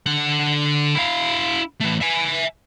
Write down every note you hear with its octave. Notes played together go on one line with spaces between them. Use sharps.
D3 F#5
E4 F5
E3 A3
E5 G#5